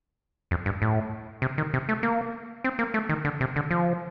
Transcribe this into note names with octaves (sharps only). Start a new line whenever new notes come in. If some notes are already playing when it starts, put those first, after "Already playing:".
F2
G2
A2
C3
D#3
C3
A3
A#3
C4
A#3
A3
D#3
D3
C3
D3
F3